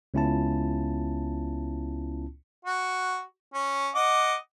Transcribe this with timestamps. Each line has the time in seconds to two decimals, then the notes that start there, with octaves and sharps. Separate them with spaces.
0.14 C#2 B3 C#4 E4 F4 A5
2.65 F#4
3.54 C#4
3.95 D#5 F#5 D6